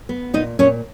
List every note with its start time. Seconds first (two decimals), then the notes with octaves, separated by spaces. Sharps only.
0.09 B3
0.34 A#2 D#4 D#5
0.59 A#2 C#4 C#5